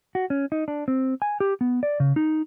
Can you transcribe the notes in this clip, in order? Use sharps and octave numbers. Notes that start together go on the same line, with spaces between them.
F#4
C#4
D#4
D4
C4
G#5
G4
B3
D5
C#3
D#4